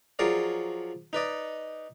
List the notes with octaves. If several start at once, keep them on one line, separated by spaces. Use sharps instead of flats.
F3 F#3 G#4 A#4 C#5 D5
D#4 B4 D5 D#5